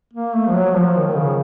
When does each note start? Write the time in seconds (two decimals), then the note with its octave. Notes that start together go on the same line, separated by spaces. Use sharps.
0.13 A#3
0.34 A3
0.48 F3
0.55 F#3
0.71 F#3
0.76 F3
0.96 D#3
1.06 D#3
1.16 C#3